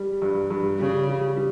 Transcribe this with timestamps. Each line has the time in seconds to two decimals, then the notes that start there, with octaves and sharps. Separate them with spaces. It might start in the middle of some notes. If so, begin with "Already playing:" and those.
Already playing: G3
0.22 G2
0.50 G2
0.79 C#3 G3
1.08 G3
1.36 G3